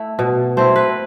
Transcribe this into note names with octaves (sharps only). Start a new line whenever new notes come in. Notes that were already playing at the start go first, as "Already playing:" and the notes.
Already playing: A3 E4
B2
A3 C4 E4 C5
B4